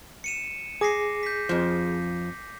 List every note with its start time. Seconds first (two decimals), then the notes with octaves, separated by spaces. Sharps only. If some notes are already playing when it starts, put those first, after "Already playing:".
0.24 C#7 D#7 E7
0.81 G#4 D6 A#6 C7
1.23 G6 B6
1.49 F2 F3